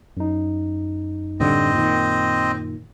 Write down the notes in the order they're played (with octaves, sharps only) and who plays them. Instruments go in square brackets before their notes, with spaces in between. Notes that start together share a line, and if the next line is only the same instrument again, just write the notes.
[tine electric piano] F#2 D#4
[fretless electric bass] A2 D3 G3 [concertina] C4 D#5
[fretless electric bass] A#2 D#3